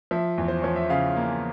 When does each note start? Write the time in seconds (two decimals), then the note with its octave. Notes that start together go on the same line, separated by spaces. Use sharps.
0.11 F3 E5
0.38 E2
0.48 C5
0.62 F3 C#5
0.76 E5
0.89 C#3 F5
1.16 A#3